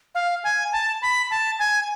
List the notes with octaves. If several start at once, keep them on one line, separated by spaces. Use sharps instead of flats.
F5
G#5
A5
B5
A5
G#5